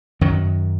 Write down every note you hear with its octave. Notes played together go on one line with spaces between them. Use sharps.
F#2 D#3 F#3